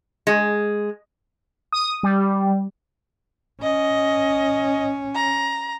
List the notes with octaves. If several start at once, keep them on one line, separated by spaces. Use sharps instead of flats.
G#3
D#6
G3
C#4 D#5
A#5